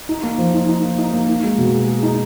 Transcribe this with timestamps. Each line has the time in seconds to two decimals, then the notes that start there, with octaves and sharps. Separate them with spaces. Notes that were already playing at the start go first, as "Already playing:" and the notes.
0.09 D#4
0.23 A#3
0.38 F3
0.54 D#4
0.69 D#4
0.83 A#3
0.98 D#4
1.13 A#3
1.28 D#4
1.43 G#3
1.58 B2
1.73 G#4
1.88 G#4
2.03 D#4